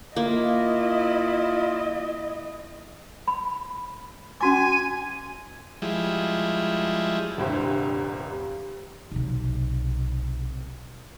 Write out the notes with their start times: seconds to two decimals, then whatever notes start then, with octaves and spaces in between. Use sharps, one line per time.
0.16 A#3 E4 F4 D#5
3.28 B5
4.41 C#4 F#4 G#5 D6
5.82 F3 G3 G#3 E4
7.37 D#1 C2 G2 G4 C5
9.12 B1 C3